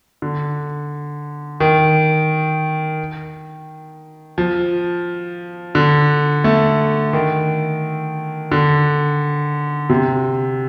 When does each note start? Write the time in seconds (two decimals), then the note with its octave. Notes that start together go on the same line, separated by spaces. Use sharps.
0.22 D3
1.60 D#3
4.38 F3
5.75 D3
6.44 A3
7.13 D#3
8.52 D3
9.89 C3